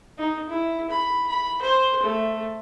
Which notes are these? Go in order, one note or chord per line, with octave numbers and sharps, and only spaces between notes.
D#4
E4
B5
B5
C5
A3